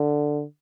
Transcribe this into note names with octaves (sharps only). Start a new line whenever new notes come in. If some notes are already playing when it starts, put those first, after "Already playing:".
Already playing: D3